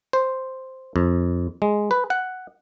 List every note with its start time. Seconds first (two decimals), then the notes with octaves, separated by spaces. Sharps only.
0.13 C5
0.96 F2
1.62 G#3
1.91 B4
2.10 F#5